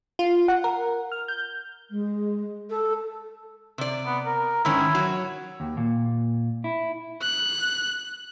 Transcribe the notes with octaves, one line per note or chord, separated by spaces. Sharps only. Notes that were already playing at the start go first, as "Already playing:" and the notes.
F4
F#5
A#4
F6
G6
G#3
A4
C3 D5
B3
A#4
G#2 D#3 C#4 E4
F#3
D#2
A#2
E4
F#6